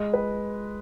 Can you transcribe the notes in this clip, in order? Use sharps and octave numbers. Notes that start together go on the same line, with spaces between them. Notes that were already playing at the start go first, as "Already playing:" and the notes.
Already playing: G#3
B4